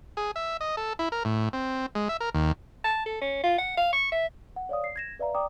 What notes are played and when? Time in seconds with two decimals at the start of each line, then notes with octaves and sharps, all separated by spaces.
0.17 G#4
0.36 E5
0.61 D#5
0.77 A4
0.99 E4
1.12 A#4
1.25 A2
1.53 C4
1.95 G#3
2.09 E5
2.20 A#4
2.35 D#2
2.84 A5
3.06 A4
3.21 C#4
3.43 F4
3.58 F#5
3.77 F5
3.93 C#6
4.12 E5
4.56 F#5
4.69 C#5 D5 F5 D#6
4.84 C7
4.96 G#6 A#6 E7
5.19 B4 D5 E5 F5 A#5
5.35 D5 G5 A#5 D6 D#6